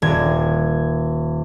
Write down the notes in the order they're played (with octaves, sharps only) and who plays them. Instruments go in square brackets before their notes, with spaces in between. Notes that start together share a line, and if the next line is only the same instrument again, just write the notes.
[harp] D#1 G#6